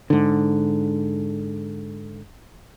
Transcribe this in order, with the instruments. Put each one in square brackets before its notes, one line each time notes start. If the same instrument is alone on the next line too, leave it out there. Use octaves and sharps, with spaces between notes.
[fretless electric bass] G#2 D3